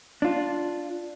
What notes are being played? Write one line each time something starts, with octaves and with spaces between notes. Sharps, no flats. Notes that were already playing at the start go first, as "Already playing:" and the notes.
D4 F4